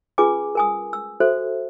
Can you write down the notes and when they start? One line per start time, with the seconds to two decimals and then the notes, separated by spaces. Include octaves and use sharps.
0.18 C#4 F4 G#4 B4 G#5 D6
0.55 A#4 G#5 D#6
0.93 E6
1.20 F#4 A4 C5 E5